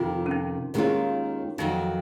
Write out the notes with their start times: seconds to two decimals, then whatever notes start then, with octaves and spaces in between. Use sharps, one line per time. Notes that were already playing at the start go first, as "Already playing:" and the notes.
Already playing: F2 C3 D#3 F4
0.26 C#4
0.31 D#4
0.74 D#2 D#3 G#3 C#4 F4
1.58 F2 D#3 F#3 D#4